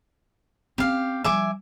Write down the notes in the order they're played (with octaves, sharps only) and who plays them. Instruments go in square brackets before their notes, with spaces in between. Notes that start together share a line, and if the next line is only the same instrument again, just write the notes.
[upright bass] C4 C#4 [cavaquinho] G4 F5
[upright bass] F3 G3 [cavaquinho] E5 G#5 D6